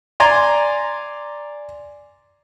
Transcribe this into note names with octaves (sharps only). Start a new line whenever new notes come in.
D5 G#5 A#5 C6